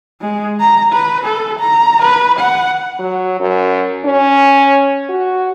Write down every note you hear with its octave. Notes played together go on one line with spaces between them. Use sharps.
G#3
A#5
B4
A4
A#5
B4
F#5
F#3
F#2
C#4
F#4